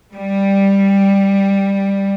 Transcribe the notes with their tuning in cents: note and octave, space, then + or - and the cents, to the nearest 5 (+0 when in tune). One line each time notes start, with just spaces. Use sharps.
G3 +5